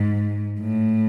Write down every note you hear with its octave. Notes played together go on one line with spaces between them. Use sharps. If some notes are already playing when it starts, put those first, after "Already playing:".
Already playing: G#2
A2